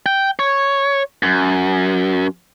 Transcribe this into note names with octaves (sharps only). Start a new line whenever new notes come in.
G5
C#5
F#2